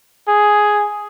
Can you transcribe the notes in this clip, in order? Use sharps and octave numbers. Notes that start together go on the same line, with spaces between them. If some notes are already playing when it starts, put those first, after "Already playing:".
G#4